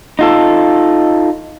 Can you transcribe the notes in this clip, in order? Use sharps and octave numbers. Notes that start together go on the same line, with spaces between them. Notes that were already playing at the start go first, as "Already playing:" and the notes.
D#4 F4 A4